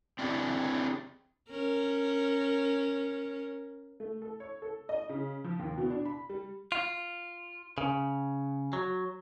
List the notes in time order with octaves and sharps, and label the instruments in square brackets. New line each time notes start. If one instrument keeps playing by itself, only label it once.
[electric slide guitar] C4 D4 E4 G4 G#4
[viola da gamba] C#4 A#4
[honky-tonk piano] A3
A4
C#5
A4
D#5
C#3
F3
D#2
B2
D4
B5
G3
[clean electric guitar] F4
C#3
F#3